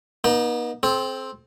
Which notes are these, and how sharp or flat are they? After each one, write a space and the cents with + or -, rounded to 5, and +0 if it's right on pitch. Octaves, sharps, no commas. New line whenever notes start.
B3 -45 D#4 +0
C4 +5 A4 -40